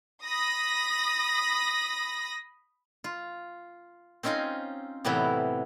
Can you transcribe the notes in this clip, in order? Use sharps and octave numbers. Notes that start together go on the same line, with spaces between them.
B5 D#6 A#6
F4
C4 C#4 D#4 F4 D#5 G#5
A2 C3 E3 F#3 B3 E4